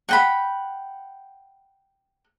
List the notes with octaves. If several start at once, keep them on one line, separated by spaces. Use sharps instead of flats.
F#5 G5 B5